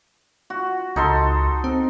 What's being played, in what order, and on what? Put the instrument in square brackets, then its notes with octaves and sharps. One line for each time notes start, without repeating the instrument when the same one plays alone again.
[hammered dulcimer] F#4
[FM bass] C#2 [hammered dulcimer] D#4 A4 C6
[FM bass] C4